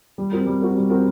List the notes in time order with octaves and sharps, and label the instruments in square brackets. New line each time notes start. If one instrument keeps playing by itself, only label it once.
[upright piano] G3
C4 F#4 A#4
G3
C4 F#4 A#4
G3
C4 F#4 A#4